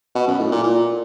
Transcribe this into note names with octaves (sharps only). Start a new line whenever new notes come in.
B2
F#2
A2
A#2
A#2